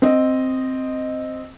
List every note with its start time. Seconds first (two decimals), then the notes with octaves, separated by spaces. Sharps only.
0.02 C4 D#5